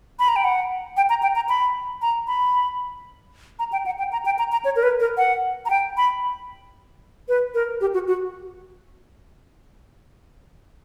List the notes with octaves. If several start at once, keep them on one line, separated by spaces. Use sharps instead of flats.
B5
A#5
G5
F#5
G5
A#5
G5
A#5
B5
A#5
B5
A#5
G5
F#5
G5
A#5
G5
A#5
A#5
C#5
A#4
B4
A#4
F#5
A#5
G5
B5
B4
A#4
G4
F#4
F#4